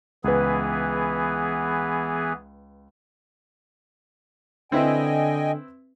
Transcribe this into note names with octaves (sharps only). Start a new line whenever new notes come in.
C#2 E3 B3 G#4 B4
D3 C4 E4 B4 D#5 G5 G#5